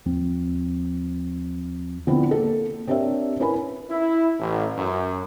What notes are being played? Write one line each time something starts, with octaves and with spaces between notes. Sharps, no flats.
D#2 F3 C4
D3 F3 B3 C4 D4 E4
A#3 A4
C4 D4 G4 A#4 C#5 E5
C#4 E4 A#4 B4 G#5 B5
E4
A1
F#2